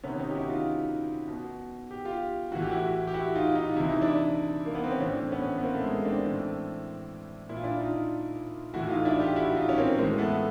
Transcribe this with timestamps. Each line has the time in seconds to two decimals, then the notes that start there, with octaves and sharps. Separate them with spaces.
0.04 C3 D#3 B3 C#4
0.20 C#4 D#4
0.31 G4
0.35 E4 F#4
0.50 D#4 F4
1.28 B2
1.91 G4
2.05 F4 G4
2.52 A2 E3 F#4
2.62 G4
2.71 E4 F#4
3.07 G4
3.14 E4 F#4
3.35 D#4 F4
3.55 D#4 F4
3.76 C3 E3 E4
3.88 D#4
4.01 D4 E4
4.66 A#3
4.75 B3
4.84 C4
4.92 C#4
5.00 A2 E3 C4 D4
5.32 B3 C#4
5.58 B3
5.63 A#3 C4
5.75 A3
5.83 G#3 A#3
6.05 C4 D4
6.25 A2 E3
7.49 A#2 E4
7.57 F4
7.63 D4 E4
7.81 D#4 F4
8.74 A2 E3 E4 F#4
8.89 D#4 F4
9.05 D4 E4
9.20 F4 G4
9.35 E4 F#4
9.56 D#4 F4
9.69 C#4
9.78 A#3 C4
9.98 A2 G#3 A#3
10.02 E3
10.18 A3 B3